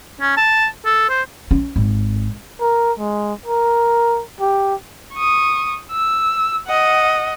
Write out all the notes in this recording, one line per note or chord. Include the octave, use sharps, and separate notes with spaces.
C#4
A5
A4
C5
C#4
G#1
A#4
G#3
A#4
G4
C#6 D#6
E6
D#5 F#5